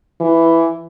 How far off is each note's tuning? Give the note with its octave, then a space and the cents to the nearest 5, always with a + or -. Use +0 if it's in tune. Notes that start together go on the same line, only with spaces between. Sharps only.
E3 +5